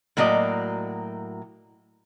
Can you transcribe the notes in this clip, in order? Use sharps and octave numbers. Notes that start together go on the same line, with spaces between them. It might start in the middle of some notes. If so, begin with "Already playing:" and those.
A2 F#3 A#3 F#4 D5 D#5